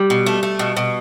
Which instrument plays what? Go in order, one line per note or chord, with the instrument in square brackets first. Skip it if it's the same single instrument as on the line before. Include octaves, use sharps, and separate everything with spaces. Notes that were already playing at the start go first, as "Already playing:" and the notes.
Already playing: [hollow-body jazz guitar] G3
[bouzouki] B2
A3
A3
B2
B2